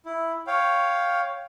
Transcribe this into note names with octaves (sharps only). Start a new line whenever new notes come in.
E4
C#5 F5 G5